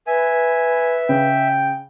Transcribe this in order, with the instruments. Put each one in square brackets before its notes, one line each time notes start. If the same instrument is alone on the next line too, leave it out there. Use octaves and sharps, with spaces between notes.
[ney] B4 [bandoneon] E5 [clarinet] G#5
[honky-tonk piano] C#3 [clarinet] G5